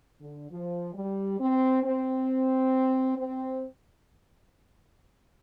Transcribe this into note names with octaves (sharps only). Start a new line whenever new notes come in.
D3
F3
G3
C4
C4
C4